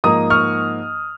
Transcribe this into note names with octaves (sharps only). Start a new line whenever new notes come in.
G#2 F3 A#3 D#4 A#5 D#6
C#6 F6